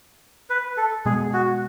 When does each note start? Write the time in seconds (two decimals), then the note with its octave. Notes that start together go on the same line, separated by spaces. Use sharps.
0.50 B4
0.77 A4
1.05 B2 G#3 B3 G#4
1.33 F#4